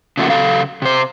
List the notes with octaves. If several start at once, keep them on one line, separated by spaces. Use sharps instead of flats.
C#3 F3 F#3 A3 A#3 F#4
C#3 F#3 A4 F5
C3 C5